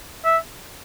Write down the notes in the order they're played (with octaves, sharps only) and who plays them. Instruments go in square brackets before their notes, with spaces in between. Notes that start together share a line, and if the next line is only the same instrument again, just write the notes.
[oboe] E5